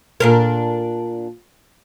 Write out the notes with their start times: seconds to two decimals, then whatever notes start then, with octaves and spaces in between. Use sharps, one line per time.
0.20 A#2 D4 A#4